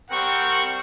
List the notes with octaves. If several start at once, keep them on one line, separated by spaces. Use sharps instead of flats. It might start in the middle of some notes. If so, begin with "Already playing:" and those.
G3 C4 A#4 F#5 G5 C#6